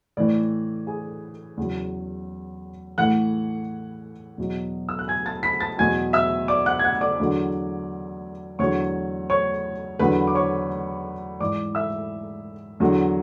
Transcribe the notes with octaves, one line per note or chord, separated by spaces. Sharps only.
A2 E3 D5
G#4 G#5
E2 C#3 F#3
A2 E3 F#5 F#6
E2 B2 F#3
E6
F#6
G#5 G#6
A5 A6
B5 B6
A5 A6
E2 B2 F#3 G#5 G#6
E5 E6
D5 D6
F#5 F#6
G#6
F#5 F#6
D5 D6
E2 D3 F#3
E2 D3 F#3 C#5 C#6
C#5 C#6
E2 D3 F#3 B4 B5
D6
C#5 C#6
G#2 E3 D5 D6
E5 E6
E2 D3 F#3